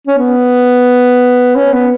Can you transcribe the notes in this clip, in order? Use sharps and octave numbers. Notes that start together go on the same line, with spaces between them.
C#4
B3
C#4
B3